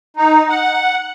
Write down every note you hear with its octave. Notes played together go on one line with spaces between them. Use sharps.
D#4
F#5